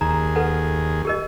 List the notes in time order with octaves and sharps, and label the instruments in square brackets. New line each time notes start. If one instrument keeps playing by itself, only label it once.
[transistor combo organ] D#2 G#4 [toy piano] A#5
[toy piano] A4 B4 F#5
G4 A#4 D#5